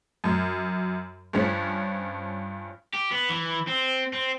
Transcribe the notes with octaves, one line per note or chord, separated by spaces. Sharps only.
F#2
G2 F3 C#4 B6
G4
B3
E3
C4
C4